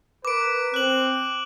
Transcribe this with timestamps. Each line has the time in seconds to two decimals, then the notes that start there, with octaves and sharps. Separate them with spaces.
0.25 A#4 B4 D6 D7
0.74 C4 F#6 F#7